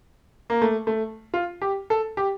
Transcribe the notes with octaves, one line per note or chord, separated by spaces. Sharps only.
A#3
A3
A3
F4
G4
A4
G4